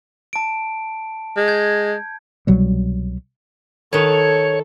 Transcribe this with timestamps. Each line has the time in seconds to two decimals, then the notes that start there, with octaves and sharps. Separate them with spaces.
0.33 A5 D7
1.37 G#3
1.48 G6 G#6
2.47 C2 B2 F#3 G3
3.93 D#3 A4 B4 C#5